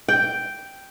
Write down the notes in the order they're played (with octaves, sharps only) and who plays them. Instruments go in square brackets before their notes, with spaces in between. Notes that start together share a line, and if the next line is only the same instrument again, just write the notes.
[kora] G5